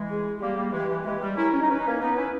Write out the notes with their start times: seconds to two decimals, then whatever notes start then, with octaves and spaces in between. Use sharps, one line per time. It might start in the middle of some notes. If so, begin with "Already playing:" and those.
Already playing: E3 G#3
0.10 G#4
0.41 G3 A#3 G4
0.57 G3 A#3
0.73 E3 G#3 G4
0.89 E3
1.05 E3 G#3 G4
1.21 G3
1.36 C#4 E4 A#4
1.53 C#4
1.61 D#4
1.69 C#4 B4
1.79 D#4
1.87 A#3 C#4
2.01 B3 D#4 B4
2.17 C#4 E4